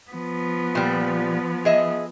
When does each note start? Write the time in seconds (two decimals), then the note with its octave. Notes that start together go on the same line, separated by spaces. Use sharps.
0.12 F3 B3
0.75 A#2 G3
1.65 G#4 D#5 E5